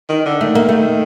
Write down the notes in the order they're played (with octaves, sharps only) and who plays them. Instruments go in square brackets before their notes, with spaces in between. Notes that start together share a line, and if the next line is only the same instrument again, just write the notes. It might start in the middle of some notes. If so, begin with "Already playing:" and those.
[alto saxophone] D#3
D3
[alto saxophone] D#3 [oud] A3
[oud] A#3
A3